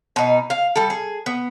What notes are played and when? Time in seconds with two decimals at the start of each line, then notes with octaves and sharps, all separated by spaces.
0.16 B2 D#4
0.50 F5
0.76 G3 A4
0.90 G#4
1.26 B3